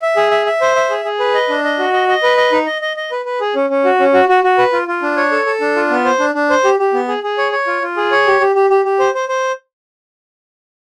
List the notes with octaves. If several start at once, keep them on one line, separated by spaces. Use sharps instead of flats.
E5
G#4
E5
E5
C5
E5
G#4
G#4
B4
D#5
D4
D#5
F#4
D#5
D#5
B4
D#5
D#4
D#5
D#5
D#5
B4
B4
G#4
C#4
C#4
F#4
C#4
F#4
F#4
F#4
B4
F4
F4
D4
C#5
A4
A4
D4
F4
B3
C5
D4
D4
C5
G4
G4
B3
G#4
G#4
C#5
C#5
F4
F4
G#4
C#5
G4
G4
G4
G4
G4
C5
C5
C5